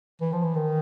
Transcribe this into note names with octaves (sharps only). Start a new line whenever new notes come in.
E3
F3
E3
D#3